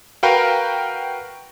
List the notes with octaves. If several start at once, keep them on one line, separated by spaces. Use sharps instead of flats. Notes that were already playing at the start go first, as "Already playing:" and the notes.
F#4 A#4 B4 F5 G5